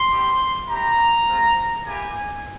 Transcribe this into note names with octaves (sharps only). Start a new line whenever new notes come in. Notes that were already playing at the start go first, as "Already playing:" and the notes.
Already playing: C6
G3 C4 E4 G4
C4 E4 G4 A#5
G#3 C4 F4
A#3 E4 G4 G#5